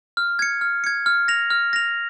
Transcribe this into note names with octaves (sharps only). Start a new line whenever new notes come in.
F6
G#6 C#7
F6
G#6 C#7
F6
A#6 F7
F6
A#6 F7